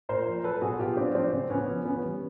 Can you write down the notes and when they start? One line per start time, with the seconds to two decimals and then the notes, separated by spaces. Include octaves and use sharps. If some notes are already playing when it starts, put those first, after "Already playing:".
0.09 A#2 A#4 C5
0.26 F3
0.44 F#3 A4 B4
0.61 B2 F#4 G#4
0.79 B2 F4 G4
0.97 F#3 C4 D4
1.15 F3 C4 D4
1.33 C#3
1.50 C#3 B3 C#4
1.68 F3
1.85 E3 B3 C#4
2.03 G3